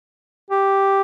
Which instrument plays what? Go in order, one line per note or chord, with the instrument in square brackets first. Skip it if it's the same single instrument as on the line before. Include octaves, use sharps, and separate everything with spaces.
[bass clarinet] G4